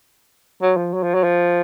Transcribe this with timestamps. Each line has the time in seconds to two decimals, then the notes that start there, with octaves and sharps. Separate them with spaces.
0.62 F#3
0.77 F3
0.94 F#3
1.03 F3
1.14 F#3
1.24 F3